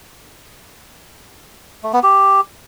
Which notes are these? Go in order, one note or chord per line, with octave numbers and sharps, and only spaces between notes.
A3
B3
G4